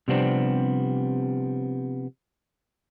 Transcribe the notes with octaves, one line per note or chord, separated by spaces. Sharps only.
C3 F3 G3 B3 C4 D4